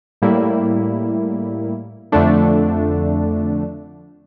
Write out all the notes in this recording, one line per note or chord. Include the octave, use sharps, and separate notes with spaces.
A2 G3 A#3 E4
F2 D3 A3 D4